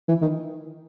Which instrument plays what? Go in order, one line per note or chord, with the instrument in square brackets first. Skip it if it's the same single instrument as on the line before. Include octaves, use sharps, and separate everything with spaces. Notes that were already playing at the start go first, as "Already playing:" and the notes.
[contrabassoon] E3
D#3